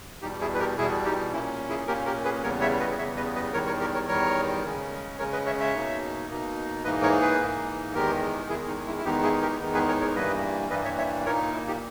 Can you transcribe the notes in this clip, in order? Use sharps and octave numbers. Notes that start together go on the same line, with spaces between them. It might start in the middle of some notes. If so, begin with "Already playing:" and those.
E2 B2 G3 D#4 G4
E4 G#4
B4
G4 A#4
E2 B2 G3 E4 G#4
D#4 G4
A#2 A#3 C#4 E4
E4 G#4
A#2 A#3 C#4 G4 A#4
G4 A#4
G#4 B4
E2 C#3 G3 B3 A#4 C#5
C#5 E5
B4 D#5
E2 C#3 G3 B3 C#5 E5
B4 D#5
B4 D#5
E2 D#3 G3 A#4 C#5
A#4 C#5
G4 A#4
A#4 C#5
E2 D#3 G3 A#4 C#5
C#3 G#3 C#4
C#3 G#3 C#4 A#4 C#5
B4 D#5
C#5 E5
C#5 E5
B2 A#3 D#4
B2 A#3 D#4
G#2 E3 A#3 D#4 B4 D#5
A#4 C#5
G#4 B4
G#2 E3 A#3 D#4
E2 D#3 G#3 G4 A#4
E2 D#3 G#3 E4 G#4
D#4
E4
E4
E2 D#3 G#3 B3 D#4 G4
E4 G#4
G4 A#4
E2 D#3 G#3 B3 D#4
G#4 B4
A#4 C#5
A#4 C#5
G2 E3 G3 A#3 B4 D#5
G2 E3 G3 A#3 B4 D#5
C#5 E5
C#5 E5
A#2 A#3 D#4 A#4 C#5
E4
D#4 G4